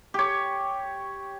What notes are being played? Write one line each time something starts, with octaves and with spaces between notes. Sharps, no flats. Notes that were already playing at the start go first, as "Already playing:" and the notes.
G4 C#5